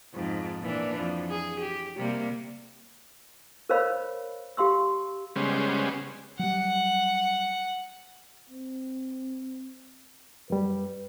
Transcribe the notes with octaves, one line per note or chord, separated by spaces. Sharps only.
F2 G#2
A#2 E3 D4
F2
G#4
G4
C3 G3 A#3
A#4 C5 C#5 D#5 F5 B5
G4 F5 C6 E6
C#3 G3 G#3 B3 C#4 C5
F#3 G3 F#5
C4
F#2 G3 B4